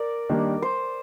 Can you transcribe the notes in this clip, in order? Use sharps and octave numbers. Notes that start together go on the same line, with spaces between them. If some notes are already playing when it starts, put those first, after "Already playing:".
Already playing: A#4 D5
D#3 G3 A#3 D4
C5